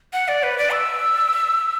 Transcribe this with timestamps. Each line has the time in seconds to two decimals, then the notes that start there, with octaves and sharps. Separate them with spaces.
0.13 F#5
0.28 D5
0.43 B4
0.58 D5
0.72 E6